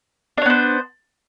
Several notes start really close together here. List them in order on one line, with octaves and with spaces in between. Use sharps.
D4 C#5 B3 C5